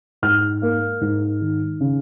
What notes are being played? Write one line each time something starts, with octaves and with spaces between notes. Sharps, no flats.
G#2 F6
A#3
G#2
D#3
C#3